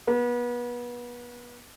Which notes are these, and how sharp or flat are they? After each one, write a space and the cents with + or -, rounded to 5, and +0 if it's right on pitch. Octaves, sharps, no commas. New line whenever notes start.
B3 -30